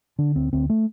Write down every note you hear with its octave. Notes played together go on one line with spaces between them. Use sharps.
D3 D4
D2 C4
D2 C4
A3